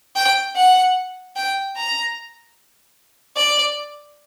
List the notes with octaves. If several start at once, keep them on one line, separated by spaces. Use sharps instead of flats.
G5
F#5
G5
A#5
D5